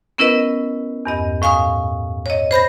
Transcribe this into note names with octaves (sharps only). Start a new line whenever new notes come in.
B3 C#4 E4 A#4 B4 D#5
E2 G2 D#5
A2 F5 G#5 C#6 D#6
C#5 D#5
C5 B5 G6 A#6